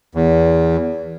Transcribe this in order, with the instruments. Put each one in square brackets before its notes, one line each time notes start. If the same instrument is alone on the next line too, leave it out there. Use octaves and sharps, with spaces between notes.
[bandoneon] E2